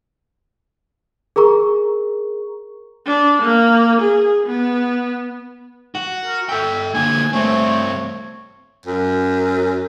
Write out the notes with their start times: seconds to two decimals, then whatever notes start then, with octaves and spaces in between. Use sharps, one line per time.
1.36 G#4 A#4 A#5 C#6
3.07 D4
3.43 A#3
4.02 G#4
4.47 B3
5.95 F#4
6.25 A#4
6.49 A4 E5 G5
6.94 D3 A#3 G#5
7.33 G2 A3 C4 C#5
8.86 F#2